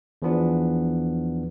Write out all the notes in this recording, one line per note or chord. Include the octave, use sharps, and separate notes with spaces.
E2 E3 F3 B3 D4